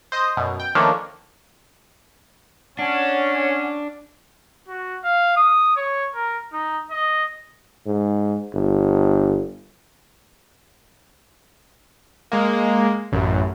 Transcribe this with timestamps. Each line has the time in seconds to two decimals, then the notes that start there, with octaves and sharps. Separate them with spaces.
0.12 C5 D#5 D#6
0.37 F#2 B2
0.60 G5
0.75 D#3 F3 A3 A#3 C#4 D4
2.79 C#4 D4 F#5
4.68 F#4
5.04 F5
5.37 D#6
5.76 C#5
6.14 A#4
6.53 D#4
6.91 D#5
7.86 G#2
8.54 G1
12.32 G#3 A#3
13.12 A1 F#2